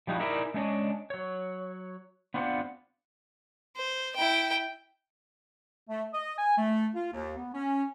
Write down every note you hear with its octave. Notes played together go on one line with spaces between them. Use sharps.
F3 G3 D#4 E4 F#4
D#4 E4 G#4 A#4 D5 E5
G#3 A3 C#4 D4 C#5 D#5
F#3 C#5
B3 C4 D4 F4 C5 F#5
C5
E4 G5
A3
D#5
G#5
A3
F4
D#2
B3
C#4